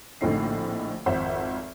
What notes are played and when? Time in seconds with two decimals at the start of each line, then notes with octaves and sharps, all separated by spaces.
0.21 A#1 A2 D3 C4 D#4 C7
1.06 G#1 F2 C5 E5 F#5